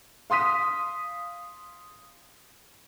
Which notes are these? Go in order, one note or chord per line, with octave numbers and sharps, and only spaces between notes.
F5 C6 D#6 B6 D#7